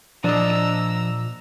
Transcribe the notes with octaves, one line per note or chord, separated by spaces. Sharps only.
A#2 F3 D4 D#5 A#5 E6